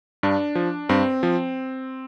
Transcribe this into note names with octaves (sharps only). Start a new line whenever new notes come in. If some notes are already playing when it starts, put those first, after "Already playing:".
G2 D4
F3
G2 C4
F3